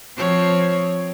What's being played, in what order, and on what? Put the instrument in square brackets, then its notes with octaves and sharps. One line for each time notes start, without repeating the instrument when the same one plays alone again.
[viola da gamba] F3 C4 C#5